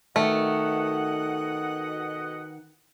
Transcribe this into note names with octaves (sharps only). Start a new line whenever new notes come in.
B2 D#3 A3 D#5 F#5